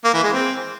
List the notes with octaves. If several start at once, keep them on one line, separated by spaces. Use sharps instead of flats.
A#3
E3
G#3
C4